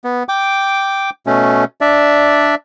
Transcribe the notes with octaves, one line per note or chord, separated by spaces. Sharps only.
B3
G5 D6
B2 A3 C#4
D4 D5 E5